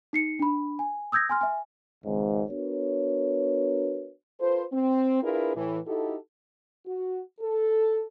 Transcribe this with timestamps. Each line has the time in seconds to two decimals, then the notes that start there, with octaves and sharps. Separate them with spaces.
0.13 D#4 C7 C#7
0.39 D4 B5
0.79 G#5
1.12 D#6 E6 G6 G#6 A#6
1.29 G#5 C6 F6
1.41 E5 G#5
2.05 G#1 C#2 G#2
2.50 B3 D4 F#4 A#4 B4 C#5
4.40 F4 A4 B4 C5
4.73 C4
5.23 D4 E4 F4 G#4 A#4 B4
5.56 A2 E3
5.86 D#4 E4 F#4 G4 A4
6.86 F#4
7.40 A4